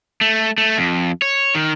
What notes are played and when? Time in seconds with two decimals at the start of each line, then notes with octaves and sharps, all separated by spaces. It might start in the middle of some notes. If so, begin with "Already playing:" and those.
0.21 A3
0.58 A3
0.78 F2
1.22 C#5
1.55 D#3